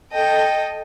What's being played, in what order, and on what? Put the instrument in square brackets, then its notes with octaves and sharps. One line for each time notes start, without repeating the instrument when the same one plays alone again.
[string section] A4 D#5 G5